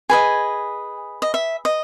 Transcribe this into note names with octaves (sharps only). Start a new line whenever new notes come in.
G#4 B4 D#5 G#5
D#5
E5
D#5